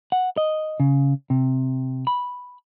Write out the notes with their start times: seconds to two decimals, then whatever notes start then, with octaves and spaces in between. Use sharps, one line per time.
0.12 F#5
0.37 D#5
0.80 C#3
1.30 C3
2.07 B5